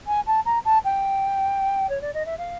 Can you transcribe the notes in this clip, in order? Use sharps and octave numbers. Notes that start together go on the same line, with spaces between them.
G#5
A5
A#5
A5
G5
C#5
D5
D#5
E5
F5